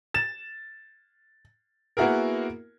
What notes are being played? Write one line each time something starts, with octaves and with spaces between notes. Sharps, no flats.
A6 E7
A#3 B3 E4 F#4 G#4 A#4